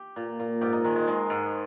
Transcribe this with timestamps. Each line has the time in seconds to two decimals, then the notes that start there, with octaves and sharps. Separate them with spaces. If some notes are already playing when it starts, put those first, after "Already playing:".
Already playing: G4
0.16 A#2
0.40 A#2
0.61 G#2 G4
0.73 D#4
0.84 D#3 G#3
0.96 G#3
1.07 D#3 G#3
1.30 G#2